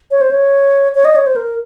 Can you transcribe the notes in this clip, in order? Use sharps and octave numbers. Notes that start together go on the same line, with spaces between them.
C#5
C5
C#5
C#5
D#5
C#5
C5
A#4